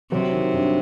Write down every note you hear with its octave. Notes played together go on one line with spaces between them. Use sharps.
C3 F#3
D#3
G2